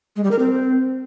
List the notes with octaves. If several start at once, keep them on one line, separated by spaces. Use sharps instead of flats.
G#3
G3
A#4
C4